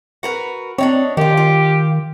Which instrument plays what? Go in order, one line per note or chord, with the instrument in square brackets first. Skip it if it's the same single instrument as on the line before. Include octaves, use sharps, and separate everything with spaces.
[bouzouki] F#4 A#4 B4
[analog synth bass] C4 [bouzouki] D4 D#4 C#5
[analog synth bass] D#3 [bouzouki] D#4 F4 [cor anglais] G4
[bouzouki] F4